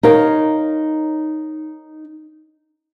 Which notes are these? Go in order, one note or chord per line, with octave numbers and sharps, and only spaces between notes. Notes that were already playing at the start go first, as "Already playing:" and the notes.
D#4 A#4 C#5 F5